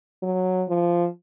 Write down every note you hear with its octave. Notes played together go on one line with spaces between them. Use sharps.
F#3
F3